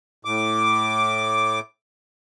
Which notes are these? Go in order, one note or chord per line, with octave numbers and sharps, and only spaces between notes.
A2 D6